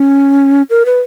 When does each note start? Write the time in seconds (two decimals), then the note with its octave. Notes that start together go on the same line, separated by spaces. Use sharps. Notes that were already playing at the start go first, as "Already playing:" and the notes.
Already playing: C#4
0.70 A#4
0.86 B4